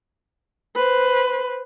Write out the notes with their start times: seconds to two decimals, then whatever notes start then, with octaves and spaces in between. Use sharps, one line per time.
0.76 B4 C5